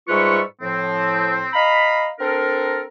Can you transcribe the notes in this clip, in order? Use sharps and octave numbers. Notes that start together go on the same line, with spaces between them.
G#2 G3 F4 B4 E5 C#6
A2 F3 C4
D#5 F5 A#5 B5
C4 D4 A4 A#4